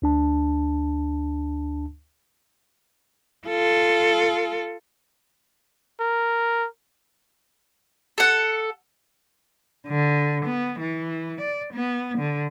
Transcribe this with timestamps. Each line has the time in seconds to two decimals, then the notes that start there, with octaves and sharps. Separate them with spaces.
0.02 D2 D4 A5
3.48 F4 A4
6.00 A#4
8.18 A4 F#5
9.87 D3
10.45 B3
10.80 E3
11.40 D5
11.73 B3
12.18 D3